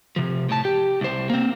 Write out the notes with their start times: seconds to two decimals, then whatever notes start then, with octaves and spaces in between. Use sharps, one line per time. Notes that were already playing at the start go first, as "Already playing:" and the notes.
0.16 C3 F3
0.49 A2 A5
0.65 G4
1.01 C2 C5
1.30 A#3 C4